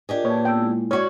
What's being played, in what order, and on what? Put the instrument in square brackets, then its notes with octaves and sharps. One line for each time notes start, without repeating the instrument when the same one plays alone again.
[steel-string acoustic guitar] D4 G4 G#4 [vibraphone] F4 A#4 D#5
[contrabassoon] A#2 [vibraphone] F4 B4 A5 [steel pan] C#5
[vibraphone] B3 A5 E6 [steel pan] G5
[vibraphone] G#3 E4
[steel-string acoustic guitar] C#4 F#4 D5 [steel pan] C#5